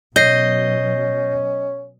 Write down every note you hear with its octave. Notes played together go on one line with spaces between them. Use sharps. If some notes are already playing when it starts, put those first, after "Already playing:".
B2 F#3 C#4 D#5 G6 A#6 C7